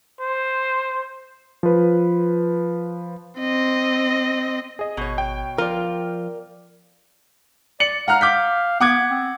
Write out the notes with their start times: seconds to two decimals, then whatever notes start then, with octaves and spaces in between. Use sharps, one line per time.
0.20 C5
1.63 F3 B4
3.40 C4 D#5
4.79 G#4 D#5
4.97 G#1 B2 C#5
5.18 G5
5.58 F3 F4 A#4 D5
7.80 D5 C#7 F#7
8.08 F5 F#5 A#5 F6
8.21 D6 G6 B6
8.80 B3 F#5 D6 G#6
9.11 C4